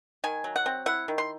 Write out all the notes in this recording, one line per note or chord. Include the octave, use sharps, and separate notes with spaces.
D#3 G#5
F#3
F#5
C4
E4 F#5
D#3
C6